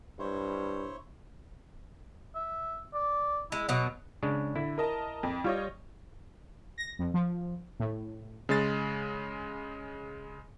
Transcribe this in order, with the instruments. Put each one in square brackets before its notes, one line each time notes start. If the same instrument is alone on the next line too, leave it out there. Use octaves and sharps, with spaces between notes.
[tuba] G2 [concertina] E4 C5 C#5
[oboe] E5
D5
[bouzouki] G#3 [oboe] E4
[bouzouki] B2 F#3 [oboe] D#5
[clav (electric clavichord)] C#3 G#3 D4
[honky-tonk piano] D3 [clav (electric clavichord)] E4
[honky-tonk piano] A#4 D#5 A5
F2
[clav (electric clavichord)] G3 [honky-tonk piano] F4 C#5 D#5
[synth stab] A#6
F2
F3
A2
[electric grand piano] C#3 G#3 A6